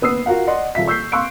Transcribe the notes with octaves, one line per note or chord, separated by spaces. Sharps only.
D#2 B3 D#6 E6 C7
F4 F#4 A#4 F5 F#5
D5 D#5 F#5 C6
D#1 A#2 F4 E5 B6
C#6 E6 G6 B6 C7
F5 C6 C#6 E6 F#6 D7